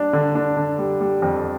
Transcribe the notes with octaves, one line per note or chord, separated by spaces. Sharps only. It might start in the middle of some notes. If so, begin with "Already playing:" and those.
Already playing: G3 D4
D3
D4
D3
G3
G3
F2